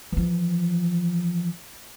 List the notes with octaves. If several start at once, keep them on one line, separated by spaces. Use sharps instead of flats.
E3 F3